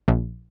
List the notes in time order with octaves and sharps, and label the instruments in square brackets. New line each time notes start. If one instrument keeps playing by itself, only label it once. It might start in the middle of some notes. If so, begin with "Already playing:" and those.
[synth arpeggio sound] A#1